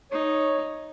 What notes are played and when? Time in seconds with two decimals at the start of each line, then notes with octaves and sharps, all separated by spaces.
0.11 D#4 C#5